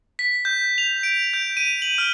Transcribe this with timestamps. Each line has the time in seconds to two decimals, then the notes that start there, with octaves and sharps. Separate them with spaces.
0.19 B6
0.45 G6
0.78 F7
1.03 D7
1.33 G6
1.57 D#7
1.82 F#7
1.98 F6